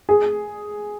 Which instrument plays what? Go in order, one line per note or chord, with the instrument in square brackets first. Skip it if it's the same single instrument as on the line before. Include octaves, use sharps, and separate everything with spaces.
[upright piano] G#4